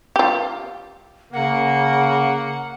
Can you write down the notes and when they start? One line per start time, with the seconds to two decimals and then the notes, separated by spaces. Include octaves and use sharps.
0.16 F4 G4
1.33 C#3 A#3 F#5